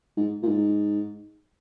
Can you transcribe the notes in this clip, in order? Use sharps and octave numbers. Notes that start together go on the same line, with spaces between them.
G#2
A#2
G#2